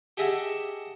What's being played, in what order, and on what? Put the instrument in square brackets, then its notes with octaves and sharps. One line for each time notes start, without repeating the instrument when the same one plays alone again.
[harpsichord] G4 G#4 D#5 E5 F#5 A5